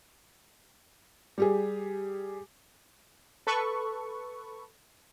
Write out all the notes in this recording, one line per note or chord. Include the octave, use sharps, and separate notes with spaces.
G3 G4 G#4
A4 B4 C#6